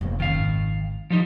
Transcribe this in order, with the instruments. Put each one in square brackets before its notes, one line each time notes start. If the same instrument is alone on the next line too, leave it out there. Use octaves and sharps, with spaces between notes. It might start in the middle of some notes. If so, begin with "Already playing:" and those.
[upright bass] F1 B2
[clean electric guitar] D#3 F5 [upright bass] F3 C#4
[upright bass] G#1
[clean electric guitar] F3 G3 D#4